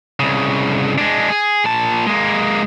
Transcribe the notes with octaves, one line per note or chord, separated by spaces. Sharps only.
C2 C#3
G#3 D4
G#4
A#2 A5
G#3 A#3